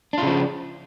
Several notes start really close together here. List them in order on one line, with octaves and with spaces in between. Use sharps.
D4 F4 C#3 F3